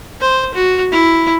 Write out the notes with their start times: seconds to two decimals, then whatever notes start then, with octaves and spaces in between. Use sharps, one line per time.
0.20 C5
0.54 F#4
0.92 E4